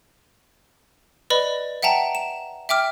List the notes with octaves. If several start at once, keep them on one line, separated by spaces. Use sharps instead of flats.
B4 D5 D#5 B5
E5 F#5 G5 A5 A#5
E7
E5 G5 D6 F6